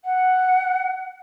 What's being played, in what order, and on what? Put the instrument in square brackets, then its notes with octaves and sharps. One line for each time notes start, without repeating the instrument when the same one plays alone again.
[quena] F#5